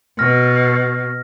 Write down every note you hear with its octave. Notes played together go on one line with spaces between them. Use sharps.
B2 F6 A#6